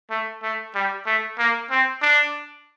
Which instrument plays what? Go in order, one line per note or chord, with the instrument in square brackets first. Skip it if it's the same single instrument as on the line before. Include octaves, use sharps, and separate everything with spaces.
[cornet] A3
A3
G3
A3
A#3
C4
D4